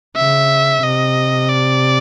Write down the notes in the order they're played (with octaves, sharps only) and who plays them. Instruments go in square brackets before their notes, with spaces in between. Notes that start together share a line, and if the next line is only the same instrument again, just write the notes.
[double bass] C#3 [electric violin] E5
[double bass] C3 [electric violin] D#5
[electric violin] D5